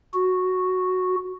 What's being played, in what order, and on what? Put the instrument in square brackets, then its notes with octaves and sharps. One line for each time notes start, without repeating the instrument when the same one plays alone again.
[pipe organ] F#4